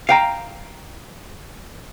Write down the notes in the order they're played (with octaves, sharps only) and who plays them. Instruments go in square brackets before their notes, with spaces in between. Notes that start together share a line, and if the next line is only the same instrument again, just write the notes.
[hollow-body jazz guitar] F5 G5 A#5